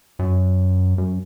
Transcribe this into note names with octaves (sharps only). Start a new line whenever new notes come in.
F#2
F#2